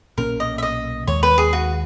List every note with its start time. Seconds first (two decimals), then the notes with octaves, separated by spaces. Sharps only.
0.18 B1 A#2 A#3 C#4 A#4
0.40 D#5
0.58 E5
0.63 D#5
1.07 D#2 D#3 G#3 C#5
1.23 B4
1.38 G#4
1.53 F#4